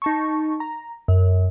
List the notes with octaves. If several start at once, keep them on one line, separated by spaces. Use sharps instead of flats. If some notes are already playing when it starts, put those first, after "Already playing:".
D#4 A5 C#6
A#5
F#2